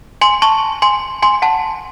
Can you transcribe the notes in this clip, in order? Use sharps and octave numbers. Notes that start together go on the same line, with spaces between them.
G#5 C6
A5 C#6
G#5 C6
G#5 C6
F#5 A5